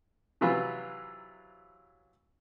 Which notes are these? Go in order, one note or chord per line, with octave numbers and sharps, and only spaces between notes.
C3 E3 F#3 F4 B4